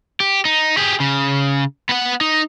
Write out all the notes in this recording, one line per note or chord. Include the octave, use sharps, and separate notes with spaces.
G4
D#4
G4 G#4
C#3
B3 F#5
D#4